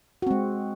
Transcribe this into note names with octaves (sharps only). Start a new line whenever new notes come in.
G#3 C4 F#4